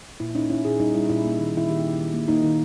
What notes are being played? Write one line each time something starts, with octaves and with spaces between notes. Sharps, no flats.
A#2 E4
C#4 D#4
C#4 E4
A#2 G#4
G3 D#4
G3 E4
A#2 E4
A#3
D#3
D#3 E4
D#3 G4
D#3
D#3
A#3
A#3 D#4
D#3